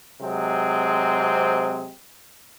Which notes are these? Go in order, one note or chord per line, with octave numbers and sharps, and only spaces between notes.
C3 F#3 G#3 C4